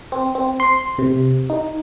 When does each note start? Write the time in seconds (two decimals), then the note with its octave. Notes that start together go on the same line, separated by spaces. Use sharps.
0.12 C4
0.35 C4
0.60 C6
0.99 C3
1.50 D#4